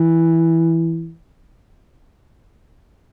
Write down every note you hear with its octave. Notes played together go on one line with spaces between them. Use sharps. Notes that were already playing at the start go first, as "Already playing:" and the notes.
Already playing: E3